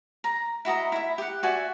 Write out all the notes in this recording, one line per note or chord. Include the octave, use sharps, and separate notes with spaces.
A#5
E4 F#4 D#5 A#5
E4 E5
G4 F#5
F#4 D5 E5 G#5